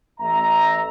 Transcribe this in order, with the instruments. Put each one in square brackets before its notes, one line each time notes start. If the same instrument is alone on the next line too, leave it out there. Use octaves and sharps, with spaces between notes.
[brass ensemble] A1 E5 A#5